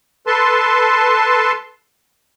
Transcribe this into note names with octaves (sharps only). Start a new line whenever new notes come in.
A4 B4 A5 C6